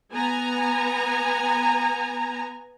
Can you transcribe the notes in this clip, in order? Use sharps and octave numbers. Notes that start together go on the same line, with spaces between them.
B3 G#5 A#5